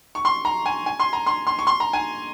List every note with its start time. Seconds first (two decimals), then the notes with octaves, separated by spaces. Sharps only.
0.15 C#6
0.25 C6
0.45 A#5
0.66 G#5
0.86 G#5
1.00 C6
1.13 A#5
1.26 C6
1.47 C6
1.59 C#6
1.67 C6
1.80 A#5
1.93 G#5